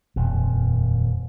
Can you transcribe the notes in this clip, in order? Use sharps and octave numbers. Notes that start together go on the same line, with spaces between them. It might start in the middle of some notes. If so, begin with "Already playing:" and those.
D#1 F2